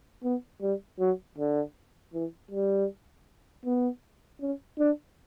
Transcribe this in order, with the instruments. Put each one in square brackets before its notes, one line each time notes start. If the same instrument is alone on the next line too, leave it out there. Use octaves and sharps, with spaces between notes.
[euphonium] B3
G3
F#3
D3
E3
G3
B3
C#4
D4